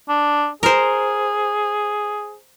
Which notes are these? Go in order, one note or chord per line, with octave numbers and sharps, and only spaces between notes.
D4
G#4 A#4 C5